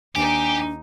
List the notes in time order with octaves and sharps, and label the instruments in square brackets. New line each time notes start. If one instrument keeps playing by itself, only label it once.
[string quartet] D#2 D#4 [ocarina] D4 [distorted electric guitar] G4 [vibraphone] G#5